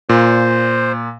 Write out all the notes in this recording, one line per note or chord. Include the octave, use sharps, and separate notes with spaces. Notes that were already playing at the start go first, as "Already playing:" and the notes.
A#2 C5